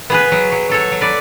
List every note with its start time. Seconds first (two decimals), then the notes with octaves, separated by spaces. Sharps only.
0.10 B3 G#4 B4
0.32 F#3
0.52 F#3
0.69 F#3 A4 C#5
0.91 F#3
1.01 B4 D5